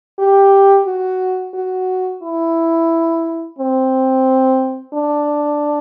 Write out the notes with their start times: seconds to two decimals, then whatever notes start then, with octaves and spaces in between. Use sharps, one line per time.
0.19 G4
0.87 F#4
1.54 F#4
2.23 E4
3.59 C4
4.94 D4